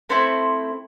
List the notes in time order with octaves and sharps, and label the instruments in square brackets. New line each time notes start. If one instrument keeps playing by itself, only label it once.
[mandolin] A3 C4 E4 C5